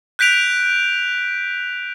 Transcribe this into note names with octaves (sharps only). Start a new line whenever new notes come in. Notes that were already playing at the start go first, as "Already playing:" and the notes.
F#6 G6 B6 D7 F7